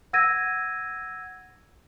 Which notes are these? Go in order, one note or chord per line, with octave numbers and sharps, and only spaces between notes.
F#5 E6 G#6 A#6 D#7